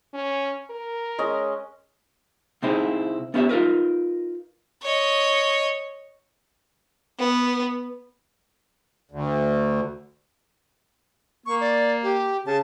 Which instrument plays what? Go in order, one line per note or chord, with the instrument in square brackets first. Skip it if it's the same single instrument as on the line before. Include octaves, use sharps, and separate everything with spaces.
[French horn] C#4
A#4
[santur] G#3 C#4 D#5
[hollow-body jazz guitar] C3 C4 D#4 E4 G#4
B3 C#4 E4 G4 C#5 E5
D#4 F4 A#4 B4
[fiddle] C#5 D#5
[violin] B3
[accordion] D2
[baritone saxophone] A#3 [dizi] C#6
[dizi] D5
G4
[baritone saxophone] C#3 [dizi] A5